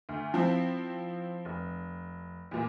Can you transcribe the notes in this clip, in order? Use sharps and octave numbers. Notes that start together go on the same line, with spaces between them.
D2
F3 C4 E4
F1
E2 A#2